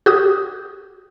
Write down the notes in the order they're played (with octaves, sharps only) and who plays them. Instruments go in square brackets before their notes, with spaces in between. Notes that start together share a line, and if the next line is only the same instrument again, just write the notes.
[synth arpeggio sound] F#4 G4 D#6